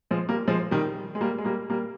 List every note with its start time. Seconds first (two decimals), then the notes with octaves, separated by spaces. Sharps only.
0.11 F3 G#3
0.29 G3 A#3
0.47 F3 G#3
0.71 D#3 G3
1.15 G#3
1.21 G3 A#3
1.38 G#3
1.45 G3 A#3
1.70 G3 A#3